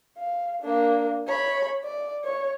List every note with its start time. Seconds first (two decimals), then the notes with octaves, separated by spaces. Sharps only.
0.18 F5
0.62 A#3 D4
1.27 C#5 B5
1.84 D5
2.25 C#5